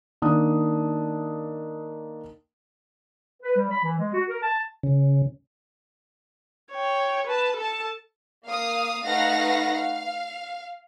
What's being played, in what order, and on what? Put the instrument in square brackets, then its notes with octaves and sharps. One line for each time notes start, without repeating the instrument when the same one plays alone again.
[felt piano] D#3 A#3 D4 D#6
[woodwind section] B4
G3
B5
E3
G#3
F#4
A#4
A5
[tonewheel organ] C#3
[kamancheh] C#5 G5
B4 A5
A4 A5
[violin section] A#3 F5 D#6
A3 D#4 B4 F5 F#5 A#6
F5